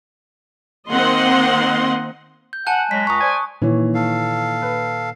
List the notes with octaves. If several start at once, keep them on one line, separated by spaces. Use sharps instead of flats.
D#3 A#3 C4 D#5 F#5 C6
G6
F#5 G#5 A5 F#6
F#3 G#3 B6
C#2 A#5 C#6 D#6
C5 D5 G#5
A#2 D#3 E3 C#5
A4 F5
B4